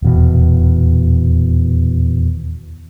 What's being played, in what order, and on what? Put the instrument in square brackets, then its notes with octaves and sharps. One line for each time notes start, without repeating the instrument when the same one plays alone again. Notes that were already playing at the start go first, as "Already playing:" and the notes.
[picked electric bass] D#1 E2 B2